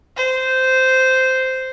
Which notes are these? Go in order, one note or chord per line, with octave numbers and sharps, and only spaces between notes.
C5